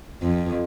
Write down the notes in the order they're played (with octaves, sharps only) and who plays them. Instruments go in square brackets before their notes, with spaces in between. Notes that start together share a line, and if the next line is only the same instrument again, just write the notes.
[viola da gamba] F2